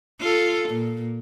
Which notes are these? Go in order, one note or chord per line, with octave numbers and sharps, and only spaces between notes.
F4 A4
A#2